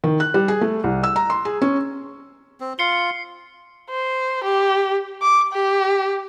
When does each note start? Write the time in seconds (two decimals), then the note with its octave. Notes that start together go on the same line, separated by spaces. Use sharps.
0.04 D#3
0.20 F#6
0.34 G3
0.48 G#4
0.61 A3
0.84 C2
1.03 E6
1.16 A#5
1.30 C6
1.45 G#4
1.62 C#4
2.60 C4
2.79 F4 C7 C#7 G7
2.93 C#7
3.90 C5
4.44 G4
5.22 D6
5.53 G4